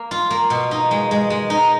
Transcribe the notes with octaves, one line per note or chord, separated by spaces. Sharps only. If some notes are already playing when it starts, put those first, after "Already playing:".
Already playing: A#3
F4
A#3
B2
D#4
G#3
G#3
G#3
D#4